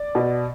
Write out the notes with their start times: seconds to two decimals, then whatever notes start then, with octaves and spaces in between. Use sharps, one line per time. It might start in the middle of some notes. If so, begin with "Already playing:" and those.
Already playing: D5
0.15 B2